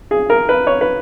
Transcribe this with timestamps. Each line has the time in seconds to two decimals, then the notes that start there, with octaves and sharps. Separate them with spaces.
0.11 G#4
0.30 A#4
0.49 B4
0.67 C#5
0.81 B4